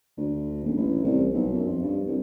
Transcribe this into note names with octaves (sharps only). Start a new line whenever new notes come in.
D2
D#1
A1
C2
B1
F#2
F2
G2
C2